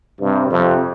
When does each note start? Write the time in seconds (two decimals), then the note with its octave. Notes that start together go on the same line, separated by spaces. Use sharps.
0.21 G2 C3
0.50 F2 C3